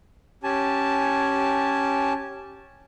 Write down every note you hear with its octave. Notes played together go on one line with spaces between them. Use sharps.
C#4 G4 G#5 A5